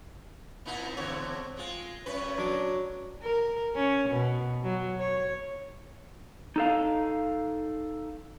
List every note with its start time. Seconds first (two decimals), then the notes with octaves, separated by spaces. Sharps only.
0.66 A#2 C4 D#4 E4
0.97 E2 D3 C#5
1.57 G#3 F4
2.06 F#2 C#4 B4 C#5
2.38 F#3 D4
3.22 A#4
3.75 C#4
4.09 B2
4.63 F#3
4.99 C#5
6.56 D#4 A4 F5